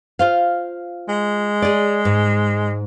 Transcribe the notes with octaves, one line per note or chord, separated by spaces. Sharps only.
F4 C5 F5
G#3
G#4 D5
G#2